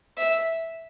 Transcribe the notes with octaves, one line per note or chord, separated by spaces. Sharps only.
E5